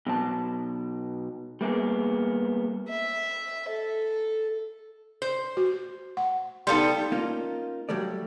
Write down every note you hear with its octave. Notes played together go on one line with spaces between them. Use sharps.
B2 F#3 A5
G3 A#3 B3 G#4
E5
A4
C5
F#4
F#5
G3 B3 D#4 A4 F5 C6
A#3 C#4 D#4 F4
F#3 G3 A3 D5